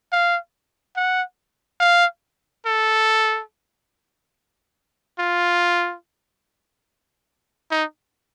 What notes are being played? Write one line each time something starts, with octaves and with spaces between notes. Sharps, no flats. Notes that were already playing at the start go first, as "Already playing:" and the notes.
F5
F#5
F5
A4
F4
D#4